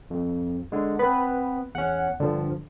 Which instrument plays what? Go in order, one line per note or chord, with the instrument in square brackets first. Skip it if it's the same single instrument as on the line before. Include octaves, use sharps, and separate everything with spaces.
[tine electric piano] F2
D3 G#3
[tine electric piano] B3 C4 [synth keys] B4
[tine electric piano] E2 C#4 [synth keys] F#5
[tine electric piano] G2 F3 [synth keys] D3